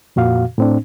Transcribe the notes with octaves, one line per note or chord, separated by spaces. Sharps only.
F2 A#2 F#4 F5
A2 C4 D4